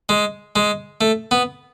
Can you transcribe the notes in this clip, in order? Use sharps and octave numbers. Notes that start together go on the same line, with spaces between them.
G#3
G#3
A3
B3